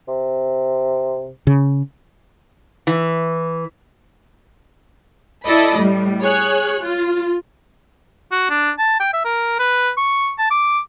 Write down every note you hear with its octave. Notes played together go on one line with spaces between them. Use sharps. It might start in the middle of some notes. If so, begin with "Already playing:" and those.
C3
C#3
E3
E4 A4 D5 D#5 B5
A2 G3
G#4 C#5 F#6
F4
F#4
D4
A5
G5
E5
A#4
B4
C#6
A5
D6